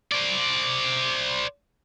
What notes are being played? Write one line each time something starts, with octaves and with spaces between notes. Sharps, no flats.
C5 D5